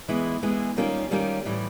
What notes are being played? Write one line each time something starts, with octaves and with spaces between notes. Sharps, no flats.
E3 G#3 B3 E4 G#4
E3 G#3 B3 E4 G#4
D#3 G3 A#3 C#4 F4
D#3 G3 A#3 C#4 F4
A2 E3 G3